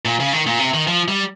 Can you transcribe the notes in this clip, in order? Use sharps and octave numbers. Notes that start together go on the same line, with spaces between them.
A#2
C#3
D#3
A#2
C3
D#3
F3
G3